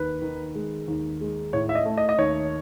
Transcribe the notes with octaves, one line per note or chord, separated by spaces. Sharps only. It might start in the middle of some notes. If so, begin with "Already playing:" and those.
Already playing: D#2 B4
D#3
G#3
D#2
G#3
A2 C#5
E5
D#5
A3
D#5
D#5
D#2 C#5